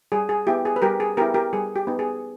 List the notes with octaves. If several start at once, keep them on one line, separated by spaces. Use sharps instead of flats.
G3 G#4
G#4
B3 E4 G4
G#4
B4
G3 G4 A#4
G#4
B3 E4 G4 A#4
G4 A#4
G3 G#4
G4
B3 D#4
G#4